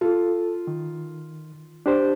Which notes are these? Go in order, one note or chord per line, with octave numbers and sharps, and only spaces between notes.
F4 A4
D#3
D4 G4 C5